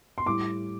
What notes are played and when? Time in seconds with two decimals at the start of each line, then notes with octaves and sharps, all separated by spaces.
0.18 C6
0.26 A2 G3 D6